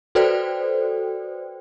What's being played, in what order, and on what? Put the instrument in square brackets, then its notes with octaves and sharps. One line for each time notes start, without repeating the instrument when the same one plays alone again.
[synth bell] F#4 A4 B4 C5 D5 G5